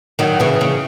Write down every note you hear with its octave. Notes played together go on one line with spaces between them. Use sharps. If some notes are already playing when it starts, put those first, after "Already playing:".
D#3 F#3
C#3 E3
C#3